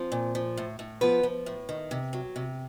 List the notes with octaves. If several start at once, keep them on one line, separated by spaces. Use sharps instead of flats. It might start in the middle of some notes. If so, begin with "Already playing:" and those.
Already playing: F3 C4
A#2
F3
A2
A2
F3 B3 B4
F3
A2
D#3
C3
F#3
C3